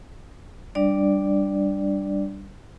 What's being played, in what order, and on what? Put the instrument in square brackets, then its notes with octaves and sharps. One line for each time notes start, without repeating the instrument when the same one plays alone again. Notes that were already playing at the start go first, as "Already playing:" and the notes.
[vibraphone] G3 D4 D5